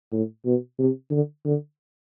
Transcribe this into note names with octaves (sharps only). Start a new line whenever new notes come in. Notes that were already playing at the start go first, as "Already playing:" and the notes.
A2
B2
C3
D3
D3